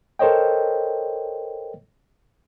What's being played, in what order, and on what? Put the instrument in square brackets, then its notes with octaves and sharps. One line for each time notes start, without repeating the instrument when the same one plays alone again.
[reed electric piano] A4 A#4 C5 C#5 D#5 G5